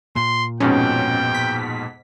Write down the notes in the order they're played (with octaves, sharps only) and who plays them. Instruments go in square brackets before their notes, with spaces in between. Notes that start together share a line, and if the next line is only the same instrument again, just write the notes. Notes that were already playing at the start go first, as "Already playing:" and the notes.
[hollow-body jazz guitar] A#2 [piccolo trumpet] C6
[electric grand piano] F2 G#2 B2 [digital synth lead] C#4 [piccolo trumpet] G5
[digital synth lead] B6